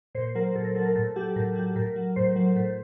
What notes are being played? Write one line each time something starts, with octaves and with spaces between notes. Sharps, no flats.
A#2 C5
F#3 A#4
A#2 A4
A#4
F#3 A4
A#4
A2 A4
F#3 G4
A2 A#4
F#3 G4
A2 A#4
F#3
A2 C5
F#3
A2